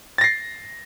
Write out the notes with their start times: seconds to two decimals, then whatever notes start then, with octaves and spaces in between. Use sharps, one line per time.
0.18 A6
0.21 A#6
0.24 C7